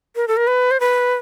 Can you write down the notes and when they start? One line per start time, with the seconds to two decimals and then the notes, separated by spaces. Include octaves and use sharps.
0.16 A#4
0.28 A4
0.37 A#4
0.47 B4
0.71 C5
0.80 B4